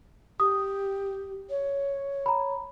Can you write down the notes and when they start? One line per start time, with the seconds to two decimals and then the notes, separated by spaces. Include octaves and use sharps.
0.40 G4 D#6
1.50 C#5
2.26 A#5 B5